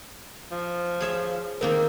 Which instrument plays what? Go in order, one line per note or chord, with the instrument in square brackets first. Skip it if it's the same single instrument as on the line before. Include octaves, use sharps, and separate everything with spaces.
[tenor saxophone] F3
[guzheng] G#4 C#5 E5
[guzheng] D#3 A#3 D#4 [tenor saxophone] C4 [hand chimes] A#4